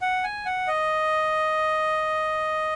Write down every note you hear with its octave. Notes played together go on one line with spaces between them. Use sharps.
F#5
G#5
F#5
D#5